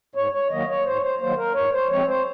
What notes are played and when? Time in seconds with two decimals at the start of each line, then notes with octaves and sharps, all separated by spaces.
0.15 G#2 C#5
0.32 C#5
0.50 D#3 F#3 A#3 D#5
0.68 C#5
0.85 G#2 C5
0.96 C#5
1.02 C5
1.19 D#3 F#3 A#3 C5
1.37 A#4
1.54 G#2 C#5
1.72 C5
1.89 F3 G#3 C4 C#5
2.07 C5